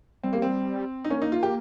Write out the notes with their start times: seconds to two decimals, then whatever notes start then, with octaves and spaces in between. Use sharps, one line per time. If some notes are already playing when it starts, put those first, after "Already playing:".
0.23 G3 C4
0.33 A#3
0.42 C4
1.05 D#4
1.10 A#3 C#4
1.22 D#4
1.32 F4
1.43 G4